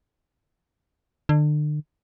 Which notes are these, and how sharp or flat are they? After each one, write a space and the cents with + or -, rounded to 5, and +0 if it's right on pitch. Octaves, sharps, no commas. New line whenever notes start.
D3 +35